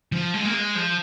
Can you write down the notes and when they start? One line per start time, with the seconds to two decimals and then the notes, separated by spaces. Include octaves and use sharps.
0.12 F3
0.34 G#3
0.44 A#3
0.54 G#3
0.75 F3